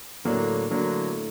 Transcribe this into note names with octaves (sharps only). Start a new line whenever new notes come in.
A2 D3 F#3 A#3 D4
A2 D3 F#3 A#3 D4